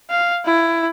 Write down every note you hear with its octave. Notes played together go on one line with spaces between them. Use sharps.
F5
E4